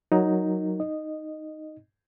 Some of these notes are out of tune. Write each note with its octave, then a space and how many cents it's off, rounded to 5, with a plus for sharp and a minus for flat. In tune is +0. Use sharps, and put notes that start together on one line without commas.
F#3 +0 D#4 +5 A#4 +0
D#4 +0 D#5 -10